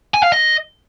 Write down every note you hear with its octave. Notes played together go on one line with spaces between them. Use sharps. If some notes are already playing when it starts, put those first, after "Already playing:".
G#5
F5
D#5